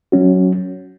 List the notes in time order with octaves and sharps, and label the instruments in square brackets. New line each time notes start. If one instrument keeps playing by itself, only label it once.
[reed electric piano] F#3 C#4 F#4